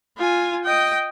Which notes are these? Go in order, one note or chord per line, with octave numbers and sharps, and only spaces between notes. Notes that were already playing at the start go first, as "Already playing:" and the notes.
F4 G#5
D#5 G5